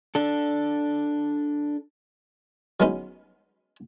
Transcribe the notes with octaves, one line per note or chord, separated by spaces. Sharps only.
D4 A4
F#3 G#3 B3 C#4 D#4